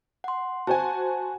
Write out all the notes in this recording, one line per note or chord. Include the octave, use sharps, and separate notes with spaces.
F#5 C6
F#4 C5 G#5 A5